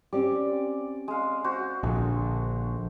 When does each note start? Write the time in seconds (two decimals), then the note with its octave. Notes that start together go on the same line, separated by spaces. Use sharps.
0.13 C4 C#4 G4 D5
1.08 G#3 F5
1.44 F#4 C5
1.83 A#1 D3